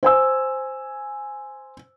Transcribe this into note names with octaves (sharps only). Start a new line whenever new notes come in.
C5 G#5 E6